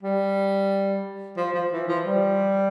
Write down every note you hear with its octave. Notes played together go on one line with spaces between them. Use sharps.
G3
F3
F3
E3
F3
G3